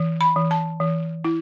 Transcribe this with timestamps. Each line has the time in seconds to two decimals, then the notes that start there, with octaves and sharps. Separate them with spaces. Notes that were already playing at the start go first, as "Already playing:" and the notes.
Already playing: E3
0.21 B5
0.36 E3
0.51 A5
0.80 E3
1.24 E4